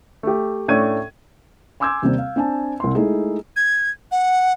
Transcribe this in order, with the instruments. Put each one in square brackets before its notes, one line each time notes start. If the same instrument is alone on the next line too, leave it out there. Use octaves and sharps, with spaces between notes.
[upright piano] A3 G4
A2 A3 C#4 D4 G#6 D#7
[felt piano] G#5 C6 D6 E6 G6 G#6
D#2 C3 G3 C4
F5
C4 D4 G#5 A5
C2 C6
G#3 A3 D#4 E4 G#4
[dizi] G#6
F#5